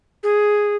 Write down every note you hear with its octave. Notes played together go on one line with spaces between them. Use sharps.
G#4